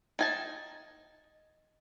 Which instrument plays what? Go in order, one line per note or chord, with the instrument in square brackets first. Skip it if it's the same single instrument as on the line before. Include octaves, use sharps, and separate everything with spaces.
[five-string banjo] D#4 G#5 A5